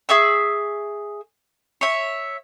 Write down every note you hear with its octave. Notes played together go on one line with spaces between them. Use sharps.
G#4 E5 C#6 E6
C#5 E5